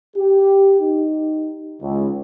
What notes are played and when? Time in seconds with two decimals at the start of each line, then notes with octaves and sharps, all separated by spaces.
0.17 G4
0.81 D#4
1.82 C#2